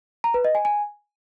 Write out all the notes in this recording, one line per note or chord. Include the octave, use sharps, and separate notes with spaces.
A#5
B4
D#5
G#5
G#5